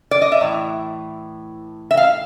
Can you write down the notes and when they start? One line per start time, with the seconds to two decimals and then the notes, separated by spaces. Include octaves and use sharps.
0.11 D5
0.22 D#5
0.32 E5
0.41 A2 E3
1.91 E5
1.97 F5